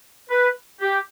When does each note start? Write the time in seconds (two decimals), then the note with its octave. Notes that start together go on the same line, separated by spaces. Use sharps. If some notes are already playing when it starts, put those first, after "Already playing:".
0.30 B4
0.80 G4